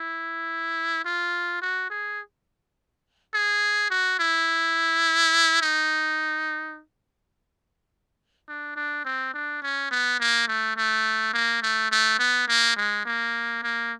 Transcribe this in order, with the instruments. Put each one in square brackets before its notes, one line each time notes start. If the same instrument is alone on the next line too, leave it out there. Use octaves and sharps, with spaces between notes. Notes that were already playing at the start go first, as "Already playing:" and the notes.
Already playing: [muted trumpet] E4
F4
F#4
G#4
G#4
F#4
E4
D#4
D4
D4
C4
D4
C#4
B3
A#3
A3
A3
A#3
A3
A3
B3
A#3
G#3
A#3
A#3